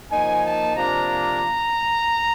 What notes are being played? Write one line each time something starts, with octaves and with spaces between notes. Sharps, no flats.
F3 A#3 D#4 G#5
A5
C3 F3 A#3 D4 A#5